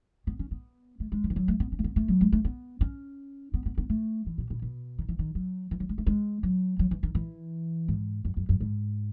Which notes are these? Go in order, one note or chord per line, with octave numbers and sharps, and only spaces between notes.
B3
C#4
B3
A3
G#3
F#3
E3
F#3
A3
B3
C#4
A3
B3
A3
F#3
G#3
A3
B3
C#4
B3
B3
B3
A3
E3
B2
B2
B2
D#3
E3
D#3
F#3
E3
F#3
G#3
A3
G#3
F#3
F#3
E3
D#3
E3
G#2
F#2
F#2
F#2
G#2